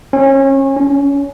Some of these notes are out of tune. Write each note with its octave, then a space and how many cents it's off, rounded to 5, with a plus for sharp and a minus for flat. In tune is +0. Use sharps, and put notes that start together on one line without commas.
C#4 -30
C#4 +20